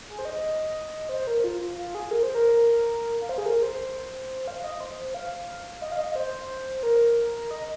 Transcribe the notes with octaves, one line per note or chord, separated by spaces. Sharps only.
G#4
C5
D#5
C5
A#4
F4
F4
F4
G#4
A#4
C5
A#4
F5
C5
G#4
A#4
C5
F5
D#5
C5
C5
F5
D#5
F5
D#5
D#5
C5
A#4
D#5